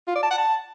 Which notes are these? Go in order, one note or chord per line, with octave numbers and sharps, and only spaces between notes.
F4
D5
A5
F#5
A5